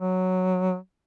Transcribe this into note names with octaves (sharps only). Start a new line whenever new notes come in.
F#3